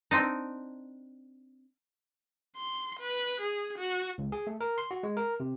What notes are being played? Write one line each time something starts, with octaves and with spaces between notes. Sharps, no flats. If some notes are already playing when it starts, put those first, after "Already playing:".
C4 D4 D#4
C6
B4
G#4
F#4
C#2
G#4
A3
A#4
C6
F#4
G#3
A#4
C3